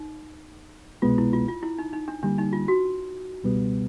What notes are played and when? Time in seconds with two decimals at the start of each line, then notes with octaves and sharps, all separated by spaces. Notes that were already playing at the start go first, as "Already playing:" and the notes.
Already playing: D#4
1.02 C2 B2 G#3 B3 F4
1.18 E4
1.33 F4
1.48 F4
1.63 E4
1.78 D#4
1.93 D#4
2.08 D4
2.23 D3 G3 A#3 D4
2.38 D#4
2.53 F4
2.68 F#4
3.43 C#2 B2 G3 B3